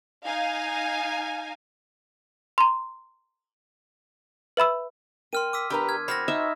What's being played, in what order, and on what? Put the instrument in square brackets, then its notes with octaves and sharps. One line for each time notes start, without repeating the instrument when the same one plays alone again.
[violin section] D#4 F5 G#5
[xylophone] A#5 C6
B4 E5 B5 E6
[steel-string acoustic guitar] A#4 G5 [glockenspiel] C6 F6 D#7
[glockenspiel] D6 E6 B6
[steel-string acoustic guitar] E2 D4 A#4 [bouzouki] G4 B4 A#5
[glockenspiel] F6 G#6
[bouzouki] C4 F#4 [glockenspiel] B5 F6 A#6
[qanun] D#4 E5